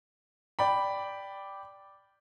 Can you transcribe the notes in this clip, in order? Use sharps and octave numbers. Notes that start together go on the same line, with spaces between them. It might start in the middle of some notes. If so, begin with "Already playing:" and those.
D5 G5 B5